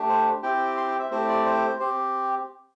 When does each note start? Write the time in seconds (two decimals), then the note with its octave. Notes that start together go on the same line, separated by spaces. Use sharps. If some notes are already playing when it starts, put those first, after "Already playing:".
Already playing: A3 D4 G4
0.09 C5
0.43 C4 E4 G4 G5
0.77 C6
0.88 G5
0.99 E5
1.11 A3 C4 E4 G4 C5
1.28 D5
1.46 C5
1.80 C4 G4 C5